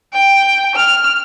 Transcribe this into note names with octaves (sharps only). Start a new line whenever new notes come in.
G5
F6